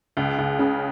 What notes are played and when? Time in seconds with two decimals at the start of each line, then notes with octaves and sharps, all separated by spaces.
0.17 C#2
0.38 C#2
0.59 C#3